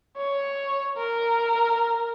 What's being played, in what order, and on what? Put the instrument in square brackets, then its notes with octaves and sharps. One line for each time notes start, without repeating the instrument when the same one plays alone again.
[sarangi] C#5
A#4